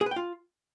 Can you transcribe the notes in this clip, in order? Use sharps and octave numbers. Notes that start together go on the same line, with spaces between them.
G#4
B4
G5
F4